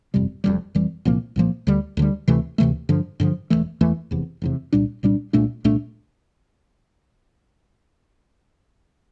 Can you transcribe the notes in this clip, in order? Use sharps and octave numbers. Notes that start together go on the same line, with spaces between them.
G1 F2 C3 G3
F1 F2 E3 G3
F1 F2 E3 G3
C2 A#2 F3 A#3
C2 A#2 F3 A#3
D2 D3 G3
D2 D3 G3
D2 C3 E3 A3
D2 C3 E3 A3
G2 D3 F3
G2 D3 F3
E1 E2 E3 A3
E1 E2 E3 A3
F1 E2 C3
F1 E2 C3
C2 A#2 G3 D4
C2 A#2 G3 D4
C2 A#2 A3 D4
C2 A#2 A3 D4